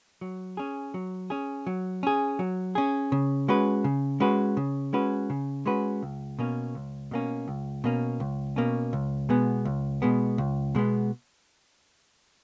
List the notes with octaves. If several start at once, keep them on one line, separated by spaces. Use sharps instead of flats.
F#3
C#4 G#4
F#3
C#4 G#4
F#3
C#4 G#4
F#3
C#4 G#4
C#3
G#3 C#4 F#4 B4
C#3
G#3 C#4 F#4 B4
C#3
G#3 C#4 F#4 B4
C#3
G#3 C#4 F#4 B4
C#2
B2 A#3 C#4
C#2
B2 A#3 C#4
C#2
B2 A#3 C#4
C#2
B2 A#3 C#4
C#2
B2 G#3 B3
C#2
B2 G#3 B3
C#2
B2 G#3 B3